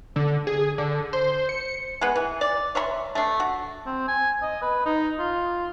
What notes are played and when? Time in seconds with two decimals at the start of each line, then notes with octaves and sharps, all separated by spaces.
0.16 D3
0.47 G#4
0.78 D3
1.13 C5
1.49 C#7
2.01 G#3 B3
2.16 E3
2.41 D5
2.75 C#5 E5 B5 C6
3.15 A3 D4
3.40 F#4
3.86 C4
4.08 G#5
4.42 D#5
4.62 B4
4.86 D#4
5.19 F4